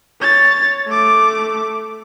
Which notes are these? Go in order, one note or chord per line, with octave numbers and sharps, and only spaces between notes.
C#5 A6
A3 D6